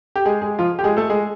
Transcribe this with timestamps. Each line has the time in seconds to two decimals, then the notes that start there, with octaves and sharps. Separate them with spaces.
0.16 G4
0.26 G#3 G#4
0.42 G#3 G#4
0.59 F3 F4
0.79 G4
0.84 G#3 G#4
0.97 A3 A4
1.10 G#3 G#4